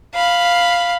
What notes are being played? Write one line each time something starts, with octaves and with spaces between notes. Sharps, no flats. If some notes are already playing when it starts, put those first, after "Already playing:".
F5 B5